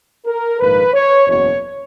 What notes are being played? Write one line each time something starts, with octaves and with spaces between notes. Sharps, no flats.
A#4
A#1 G#2 D#3 A#3 B4
C#5
F#1 E2 B2 C#5